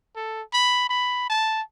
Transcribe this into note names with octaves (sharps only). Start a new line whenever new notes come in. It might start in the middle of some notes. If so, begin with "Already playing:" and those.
A4
B5
B5
A5